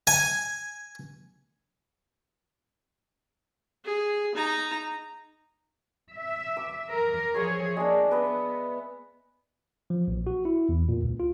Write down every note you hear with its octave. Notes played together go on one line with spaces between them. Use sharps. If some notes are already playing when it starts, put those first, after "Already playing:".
G#5
G#4
D#4 A#5
E5
D6
A#4
F3 G#4 C#5 E5 C6
G#3 A#3 D4
B3 B4 D#5 E5
F3
A#1
F#4
E4
E2
A#2
C#2
F4